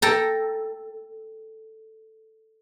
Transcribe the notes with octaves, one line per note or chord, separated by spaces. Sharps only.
A4 G5 A#5